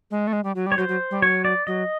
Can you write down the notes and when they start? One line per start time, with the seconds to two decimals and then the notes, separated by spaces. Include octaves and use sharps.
0.11 G#3
0.27 A3
0.33 G#3
0.44 G3
0.56 F#3
0.67 G3
0.72 C#5
0.78 F#3 C5
0.88 F#3
1.11 G3
1.22 F#3 C#5
1.45 D5
1.67 F#3 D#5